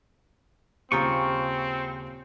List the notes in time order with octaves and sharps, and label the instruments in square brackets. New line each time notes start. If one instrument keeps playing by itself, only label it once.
[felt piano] D#1 C#3 D#6 [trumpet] C4 [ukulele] F4 G4 A#5 [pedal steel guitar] C#6